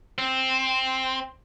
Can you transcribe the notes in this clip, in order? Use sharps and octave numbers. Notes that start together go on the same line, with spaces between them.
C4